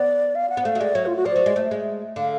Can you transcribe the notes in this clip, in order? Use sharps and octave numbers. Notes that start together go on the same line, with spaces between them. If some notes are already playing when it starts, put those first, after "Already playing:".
Already playing: B3 D5
F5
F#5
B3
A3 F5
F#3
G#3 D5
F#3 C#5
F4
F#4
F3 D5
F#3
G#3
A3
G#3
D3 F5